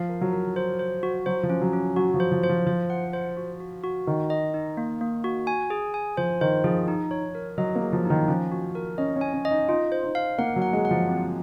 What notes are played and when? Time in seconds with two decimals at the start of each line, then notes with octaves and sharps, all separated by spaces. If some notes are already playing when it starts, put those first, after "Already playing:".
Already playing: F3 F5
0.09 A#4
0.21 F#3
0.33 A#4
0.56 C5
0.79 C5
1.03 F#4
1.26 F#3 C5
1.43 F3
1.50 C#4
1.61 F#3
1.73 C#4
1.96 F#3 F#4
2.14 F3
2.20 C5
2.32 F3
2.43 C5
2.49 F3
2.66 F3 C5
2.90 F#5
3.13 C5
3.37 F#4
3.60 F#4
3.84 F#4
4.07 D#3 D#4
4.30 D#5
4.54 D#4
4.77 A#3
5.01 A#3
5.24 F#4
5.47 G#5
5.70 G#4
5.94 G#5
6.17 F3 C5
6.41 D#3 C5
6.64 F3 G#4
6.88 D#4
7.11 C#5
7.35 A#4
7.58 F#3 D#5
7.76 A#3
7.81 G#4
7.93 F3
8.05 D#3 D#4
8.28 F3 C#4
8.51 F#4
8.75 A#4
8.98 C#4 D#5
9.16 C#4
9.21 G#5
9.33 C#4
9.45 D#5
9.51 D#4
9.69 D#4 F4
9.92 C5
10.04 D#4
10.15 F5
10.38 A#3 F#5
10.56 F#3
10.62 F#5
10.73 G#3
10.85 F#5
10.91 F3
11.09 C4